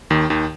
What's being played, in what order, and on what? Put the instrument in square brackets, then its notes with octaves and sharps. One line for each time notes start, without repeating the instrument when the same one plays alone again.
[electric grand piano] D#2 D#3
D#2 D#3